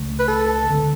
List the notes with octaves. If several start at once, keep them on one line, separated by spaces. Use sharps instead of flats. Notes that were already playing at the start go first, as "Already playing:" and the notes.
Already playing: C#2 C#3 A3
B4
A4
D2 D3 G#3 B3